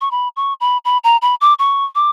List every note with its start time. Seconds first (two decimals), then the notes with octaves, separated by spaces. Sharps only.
0.01 C#6
0.11 B5
0.36 C#6
0.61 B5
0.85 B5
1.04 A#5
1.22 B5
1.41 D6
1.59 C#6
1.95 D6